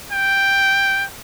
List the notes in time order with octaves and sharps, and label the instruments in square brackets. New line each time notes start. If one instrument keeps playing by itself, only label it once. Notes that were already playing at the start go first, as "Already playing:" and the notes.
[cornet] G5